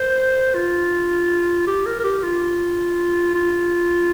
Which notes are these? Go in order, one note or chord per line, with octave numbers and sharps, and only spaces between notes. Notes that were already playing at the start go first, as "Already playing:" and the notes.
Already playing: C5
F4
G4
A#4
A#4
G4
F4
F4